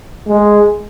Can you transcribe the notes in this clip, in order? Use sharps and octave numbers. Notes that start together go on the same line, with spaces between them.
G#3